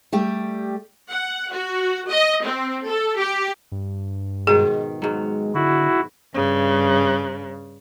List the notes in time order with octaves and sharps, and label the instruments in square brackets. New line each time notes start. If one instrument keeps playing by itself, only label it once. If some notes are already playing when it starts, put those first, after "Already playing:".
[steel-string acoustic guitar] G3 A3 G4
[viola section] F#5
F#4
D#5
C4
A4
G4
[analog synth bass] G2
[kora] G#2 B2 D#3 [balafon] G#4
[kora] G#2 F#3 [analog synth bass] G#3
[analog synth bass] D3 [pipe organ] E4 F#4
[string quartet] G2 C#3